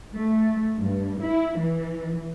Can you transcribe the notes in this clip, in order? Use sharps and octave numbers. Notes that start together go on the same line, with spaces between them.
A3
G2
E4
E3